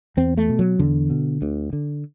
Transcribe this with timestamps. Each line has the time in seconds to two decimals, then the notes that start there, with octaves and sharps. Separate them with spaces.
0.17 E2 C4
0.37 A3
0.49 B2
0.59 F#3
0.79 E2 D3
1.10 B2
1.42 D2
1.73 D3